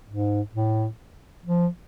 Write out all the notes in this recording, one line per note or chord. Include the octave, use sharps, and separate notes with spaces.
G#2
A2
F3